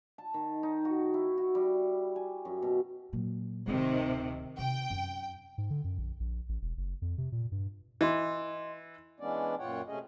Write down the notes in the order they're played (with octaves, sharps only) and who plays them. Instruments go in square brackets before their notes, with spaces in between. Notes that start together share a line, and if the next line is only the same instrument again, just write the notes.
[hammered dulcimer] A5
D#3
D#4
F#4
E4
F#4
G3
G#5
F#2
B2
[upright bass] A#2 F#3
[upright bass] D1 C4 [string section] C3 D#3
[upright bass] C3 [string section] G5
[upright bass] F#2
[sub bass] G#2
D3
F#2
A#1
A#1
A1
E1
F#1
F2
C3
A#2
G2
[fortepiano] E3 [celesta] D#5 C6
[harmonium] E3 G#3 B3 C#4 D4 D5
F#2 A#2 F4 C#5 F#5 G5
C3 A3 C#4 G#4 D#5